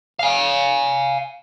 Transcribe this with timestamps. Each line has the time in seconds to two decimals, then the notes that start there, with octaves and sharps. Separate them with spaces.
0.19 F5 G#5